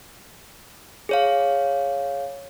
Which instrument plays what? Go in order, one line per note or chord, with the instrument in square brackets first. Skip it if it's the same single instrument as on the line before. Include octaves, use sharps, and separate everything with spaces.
[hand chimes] G#4 C#5 F5